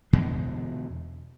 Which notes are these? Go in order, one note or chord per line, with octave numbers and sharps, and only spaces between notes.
E2 B2 D3 G#3